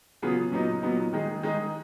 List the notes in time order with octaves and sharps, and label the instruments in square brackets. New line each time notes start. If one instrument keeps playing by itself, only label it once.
[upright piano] C#3 F#3 B3 F4 G#4
A#2 F#3 B3 D#4
A#2 F#3 B3 D#4
D#3 G#3 D#4 G#4
D#3 G#3 D#4 G#4